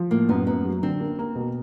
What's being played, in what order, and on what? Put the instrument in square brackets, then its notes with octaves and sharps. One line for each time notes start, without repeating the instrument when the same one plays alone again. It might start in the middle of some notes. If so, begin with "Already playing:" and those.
Already playing: [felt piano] F3
[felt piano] A2 [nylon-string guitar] A#3
[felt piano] F#2 [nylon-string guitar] B3
[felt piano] F#2 [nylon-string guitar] B3
[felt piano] F#3
[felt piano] D3 [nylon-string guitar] C4
[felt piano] A#3
A#3
B2